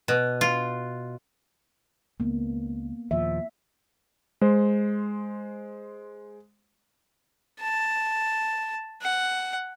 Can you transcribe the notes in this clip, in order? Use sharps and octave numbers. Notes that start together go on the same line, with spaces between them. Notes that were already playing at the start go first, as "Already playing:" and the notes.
B2
F4
C#2 A#3 B3
D#2 A#2 F3 E5
G#3 C5
A5
F#5